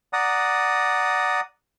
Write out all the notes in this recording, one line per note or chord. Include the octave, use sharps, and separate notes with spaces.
D5 F#5 A#5 D#6